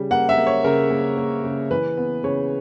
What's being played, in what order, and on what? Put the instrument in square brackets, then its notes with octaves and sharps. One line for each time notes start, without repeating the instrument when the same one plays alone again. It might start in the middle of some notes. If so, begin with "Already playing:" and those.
Already playing: [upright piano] C#3 G3
A#3 F#5
E5
A#3
C#5
C#3 A#4
A#3
A#3
C#3
E3 B4
B3
C#3 C#5